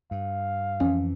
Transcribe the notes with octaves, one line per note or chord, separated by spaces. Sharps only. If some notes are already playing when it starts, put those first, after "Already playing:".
G2 F5
F2 E3 C#4